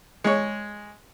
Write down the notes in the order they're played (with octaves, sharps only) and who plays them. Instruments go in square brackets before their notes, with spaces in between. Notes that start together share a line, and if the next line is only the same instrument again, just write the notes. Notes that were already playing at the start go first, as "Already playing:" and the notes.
[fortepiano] G#3 C#5